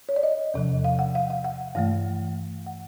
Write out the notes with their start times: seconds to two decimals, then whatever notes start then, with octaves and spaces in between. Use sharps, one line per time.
0.09 C#5
0.16 D5
0.23 D#5
0.54 E2 C3 F3
0.84 F5
0.99 F#5
1.15 F5
1.30 F5
1.44 F#5
1.75 G2 E3 A3 F5
2.66 F#5